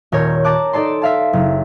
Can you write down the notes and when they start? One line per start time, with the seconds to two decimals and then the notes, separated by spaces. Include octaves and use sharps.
0.12 D#1 A#4 C#5 G6
0.44 A5 A#5 D6 F#6
0.73 D#4 A4 D5 A5 C6
1.02 E5 F5 A5
1.33 F#1